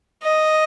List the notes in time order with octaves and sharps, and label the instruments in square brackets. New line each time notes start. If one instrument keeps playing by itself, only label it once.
[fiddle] D#5